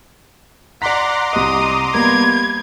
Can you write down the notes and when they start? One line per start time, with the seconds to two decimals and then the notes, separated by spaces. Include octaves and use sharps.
0.82 D5 F#5 A#5 C6 D6 B6
1.33 C2 D#5 D#6
1.94 G3 A#3 B3 G#6